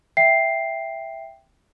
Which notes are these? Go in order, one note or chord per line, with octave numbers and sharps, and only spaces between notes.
E5 G5 C7